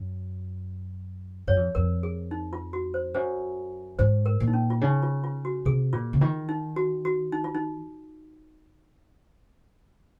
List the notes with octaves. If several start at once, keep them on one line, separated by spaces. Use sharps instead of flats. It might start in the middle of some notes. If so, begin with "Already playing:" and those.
Already playing: F#2
F#2 C#5
F2
F2 A#4
G#4
D#4
F4
F#4
C5
F#2 C5
G#2 C5
A#4
A#2
D#4
C#4
F4
C#3 D#4
F4
F4
F#4
C3 G#4
A#2 F4
C#3
D#3 F4
D#4
F#4
F#4
D#4
F4
D#4